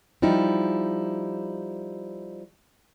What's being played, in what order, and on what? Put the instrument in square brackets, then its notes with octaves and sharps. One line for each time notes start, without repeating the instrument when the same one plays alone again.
[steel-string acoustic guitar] F3 G3 D#4 E4